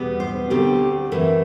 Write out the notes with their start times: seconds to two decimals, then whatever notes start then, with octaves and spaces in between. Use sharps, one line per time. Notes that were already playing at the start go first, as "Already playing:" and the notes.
Already playing: E2 B2 G3 B3
0.20 C5
0.50 D2 D3 A3 C4 G4
1.12 F#2 E3 A3